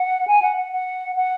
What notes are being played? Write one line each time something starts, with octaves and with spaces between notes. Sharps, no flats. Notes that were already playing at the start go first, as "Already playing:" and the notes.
Already playing: F#5
G#5
F#5
F#5
F#5
F#5